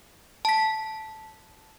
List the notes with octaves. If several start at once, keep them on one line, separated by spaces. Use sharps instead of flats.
A5 B6